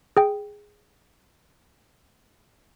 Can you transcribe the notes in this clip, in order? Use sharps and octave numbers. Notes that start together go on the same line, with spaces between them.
G#4 G5